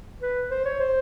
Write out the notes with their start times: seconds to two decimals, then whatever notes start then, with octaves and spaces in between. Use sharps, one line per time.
0.22 B4
0.51 C5
0.66 C#5
0.80 C5